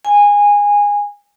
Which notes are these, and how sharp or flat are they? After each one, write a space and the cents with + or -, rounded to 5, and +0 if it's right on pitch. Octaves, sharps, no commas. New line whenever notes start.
G#5 -20